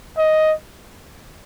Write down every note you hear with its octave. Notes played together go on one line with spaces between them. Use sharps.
D#5